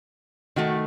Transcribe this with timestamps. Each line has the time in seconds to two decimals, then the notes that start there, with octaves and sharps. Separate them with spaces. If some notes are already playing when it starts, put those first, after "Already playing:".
0.56 D#3 A3 F#4